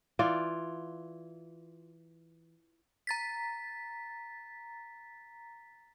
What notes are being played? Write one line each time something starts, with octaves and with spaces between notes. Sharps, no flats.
E3 F4 D5
A#5 A6 B6